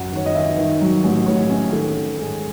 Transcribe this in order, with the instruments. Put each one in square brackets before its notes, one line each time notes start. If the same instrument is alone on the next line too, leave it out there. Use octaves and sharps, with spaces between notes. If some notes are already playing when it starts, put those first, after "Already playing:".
Already playing: [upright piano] F#2 F#5
D#3 C#5
D#5
D#3 E5
D#3
F#3
A1
A2 C#5
C#4
D#3 A4
D#3
G#2 G#4